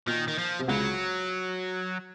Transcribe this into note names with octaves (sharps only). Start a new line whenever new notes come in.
A#2 D#3
D#3
F3
C3
C#2 C#3 F#3